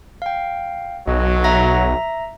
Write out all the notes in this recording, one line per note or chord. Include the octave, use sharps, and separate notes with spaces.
F5 G5
B1 F#3 D#5
E5 A#5 A#6